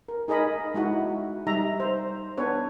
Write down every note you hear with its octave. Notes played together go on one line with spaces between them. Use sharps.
A#4
D#4 G#4 A#4 D#5 B5
G#3 D#4 E4 F#4
G3 D#4 E5 A#5
C5
B3 D4 B4 C#5